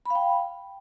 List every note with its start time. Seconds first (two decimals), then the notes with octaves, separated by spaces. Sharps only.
0.05 B5
0.10 F5
0.15 G5